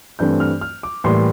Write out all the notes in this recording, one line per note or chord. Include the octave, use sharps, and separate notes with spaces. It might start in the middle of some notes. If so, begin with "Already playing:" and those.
G2 E3 A3 C4 G6
F6
F6
D6
A2 E3 G3 A#3 C6